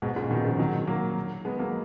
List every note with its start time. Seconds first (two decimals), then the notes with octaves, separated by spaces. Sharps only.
0.02 G#2 B2
0.16 A#2 C#3
0.31 B2 D#3
0.45 C#3 F3
0.59 D#3 F#3
0.87 F#3 A#3
1.45 G#3 B3
1.59 F#3 A#3